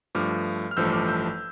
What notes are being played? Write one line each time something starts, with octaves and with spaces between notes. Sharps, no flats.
G2 F3 A3 D6 F6
F6
A1 G2 F3 A3 E6 G6
D6 F6
E6 G6